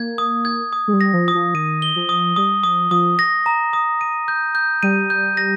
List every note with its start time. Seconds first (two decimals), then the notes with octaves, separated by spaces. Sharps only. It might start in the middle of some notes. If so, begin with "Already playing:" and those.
Already playing: A#3 G#6
0.18 D#6
0.45 G#6
0.73 D#6
0.88 G#3
0.93 G3
1.01 A#6
1.13 F3
1.28 D#6
1.34 F3
1.54 D#3 D#7
1.82 G7
1.96 F3
2.09 D#6
2.36 G3 D#6
2.63 F3 D#6
2.91 F3 D#6
3.19 A#6
3.46 A#5
3.73 D#6
4.01 D#7
4.28 G6
4.55 G6
4.83 G3 D#7
5.10 G6
5.37 A#6